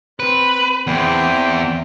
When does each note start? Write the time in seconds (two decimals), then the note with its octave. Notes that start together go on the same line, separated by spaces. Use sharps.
0.20 C4 B4
0.87 E2 C4 G5